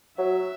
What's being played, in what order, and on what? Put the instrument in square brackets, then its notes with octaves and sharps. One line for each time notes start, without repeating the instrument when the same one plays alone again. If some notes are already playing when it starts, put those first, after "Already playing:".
[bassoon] F#3 [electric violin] E5